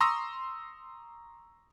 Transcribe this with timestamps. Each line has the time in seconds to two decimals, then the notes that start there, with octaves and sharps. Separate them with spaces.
0.01 A#5 C6 C#6 D#6 E6 A#6